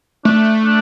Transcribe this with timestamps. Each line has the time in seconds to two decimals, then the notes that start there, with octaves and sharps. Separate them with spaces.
0.25 A3 D4
0.65 D4